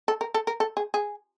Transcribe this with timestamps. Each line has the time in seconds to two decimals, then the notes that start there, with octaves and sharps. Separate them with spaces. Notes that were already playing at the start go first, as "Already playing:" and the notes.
0.08 A4
0.21 A#4
0.34 A4
0.47 A#4
0.60 A4
0.77 G#4
0.94 G#4